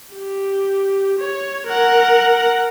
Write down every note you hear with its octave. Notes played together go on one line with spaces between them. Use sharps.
G4
C#5
A#4 F#5